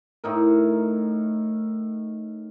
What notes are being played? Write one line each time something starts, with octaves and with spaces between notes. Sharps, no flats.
A2 D#4 A#4